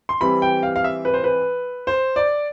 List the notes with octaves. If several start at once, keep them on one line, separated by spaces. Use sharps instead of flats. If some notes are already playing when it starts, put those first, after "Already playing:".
C6
E3 G3 C4 B5
G5
F5
F5
E5
B4
C5
B4
C5
D5